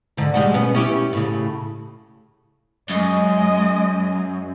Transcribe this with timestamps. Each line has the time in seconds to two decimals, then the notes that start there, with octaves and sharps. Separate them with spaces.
0.17 G#2 D3
0.34 G3 G#3 F#4
0.54 B2 B3 C#4
0.74 C#4 E4 G4
1.13 A2 C#3
2.90 F#2 G#3 D#5